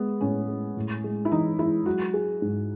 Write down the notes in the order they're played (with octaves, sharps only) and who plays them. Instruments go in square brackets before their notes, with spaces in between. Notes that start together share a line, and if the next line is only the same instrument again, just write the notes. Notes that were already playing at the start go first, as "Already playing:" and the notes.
Already playing: [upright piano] G#3 [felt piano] B3
[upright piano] A2 [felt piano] C#4
[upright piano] G#3
A2
G#3
[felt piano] E4
[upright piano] E3 [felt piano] D#4
[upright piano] G#3 [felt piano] E4
[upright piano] F#3 [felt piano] F#4
[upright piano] G#4
G#2